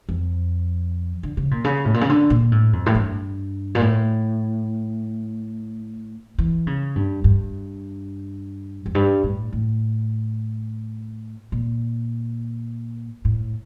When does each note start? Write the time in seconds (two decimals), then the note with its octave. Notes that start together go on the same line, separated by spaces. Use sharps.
0.09 F2
1.23 D3
1.37 C#3
1.51 A#2
1.64 C#3
1.85 A2
1.94 A#2
2.01 C#3
2.09 D3
2.30 A#2
2.52 A2
2.73 F2
2.86 A2
2.95 G2
3.75 A#2
3.81 A2
6.38 E3
6.67 C#3
6.96 G2
7.24 G2
8.86 F2
8.95 G2
9.24 A2
9.53 A2
11.52 A#2
13.25 A2